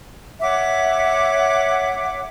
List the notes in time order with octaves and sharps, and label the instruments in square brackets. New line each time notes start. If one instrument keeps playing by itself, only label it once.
[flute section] C#5 E5 F#5 D6